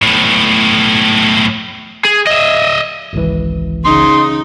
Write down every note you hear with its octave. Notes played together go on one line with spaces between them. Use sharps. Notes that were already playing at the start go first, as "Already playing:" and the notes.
B1 A2
G#4
D#5 E5
G#1 C#2 E3
C#3 D#4 C6